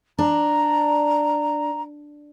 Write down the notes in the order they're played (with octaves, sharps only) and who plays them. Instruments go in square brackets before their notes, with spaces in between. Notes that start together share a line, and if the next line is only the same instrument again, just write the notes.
[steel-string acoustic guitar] D4 [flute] A#5